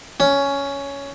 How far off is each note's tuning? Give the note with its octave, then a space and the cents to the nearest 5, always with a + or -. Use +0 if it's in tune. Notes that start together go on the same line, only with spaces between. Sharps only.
C#4 +10